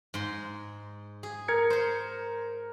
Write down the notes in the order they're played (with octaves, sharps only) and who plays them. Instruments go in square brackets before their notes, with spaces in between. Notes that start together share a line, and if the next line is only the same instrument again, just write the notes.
[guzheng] G#2 C6
G#4
[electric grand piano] A#4 G#6 C#7
[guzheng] C5 C6